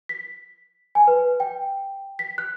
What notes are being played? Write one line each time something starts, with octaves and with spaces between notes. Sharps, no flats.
B6
G#5
B4
G5
B6
F#6